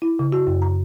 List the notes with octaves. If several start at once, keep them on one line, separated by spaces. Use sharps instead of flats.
E4
C#3
F#4
F#2
A#5